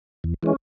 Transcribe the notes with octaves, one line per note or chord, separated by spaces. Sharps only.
E2
E3 G#3 C#4